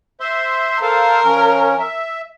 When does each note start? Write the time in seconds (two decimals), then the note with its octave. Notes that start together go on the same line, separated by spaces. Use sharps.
0.20 C5 E5 C6
0.82 A4 A#4 C5 F5
1.25 F3 C#4
1.79 E5